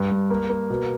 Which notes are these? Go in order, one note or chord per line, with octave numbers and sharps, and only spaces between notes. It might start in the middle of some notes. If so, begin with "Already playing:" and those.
Already playing: G2
G2
A#3
A#3
B2